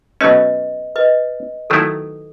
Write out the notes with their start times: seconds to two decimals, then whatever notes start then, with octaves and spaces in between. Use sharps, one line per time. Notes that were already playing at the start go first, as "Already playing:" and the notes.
0.21 B2 F#3 A3 C#4 B4 D#5
0.96 B4 D#5
1.70 D#3 F#3 A3 E4 A4